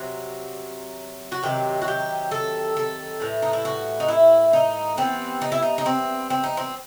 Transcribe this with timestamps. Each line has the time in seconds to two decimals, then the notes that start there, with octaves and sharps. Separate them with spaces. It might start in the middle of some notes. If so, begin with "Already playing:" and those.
Already playing: C3 F#3
1.32 F#4
1.43 C3 D#3 F#3 G4
1.82 F#4
1.88 G4
2.31 A4
2.77 A4
3.20 A2 E3 G3
3.42 D#4
3.53 E4
3.65 F#4
4.00 D#4
4.08 E4
4.53 D#4
4.97 E3 G3 B3 C4
5.42 D#4
5.52 E4
5.63 D#4
5.78 D#4
5.86 C4
6.30 C4
6.44 D#4
6.57 C4